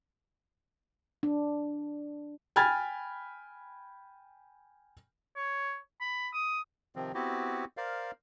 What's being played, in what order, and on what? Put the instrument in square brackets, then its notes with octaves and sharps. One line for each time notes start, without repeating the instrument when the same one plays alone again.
[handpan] D4
[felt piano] G5 G#5 B5 F6 G#6 A6
[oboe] C#5
B5
D#6
[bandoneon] C3 D#3 F3 C4
B3 C4 E4 F#4 G4
A#4 C5 D5 F5